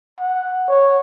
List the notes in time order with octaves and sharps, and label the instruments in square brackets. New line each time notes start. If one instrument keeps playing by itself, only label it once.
[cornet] F#5
C#5